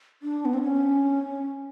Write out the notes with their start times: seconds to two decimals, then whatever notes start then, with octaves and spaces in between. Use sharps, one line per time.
0.22 D4
0.45 B3
0.53 C4
0.63 C#4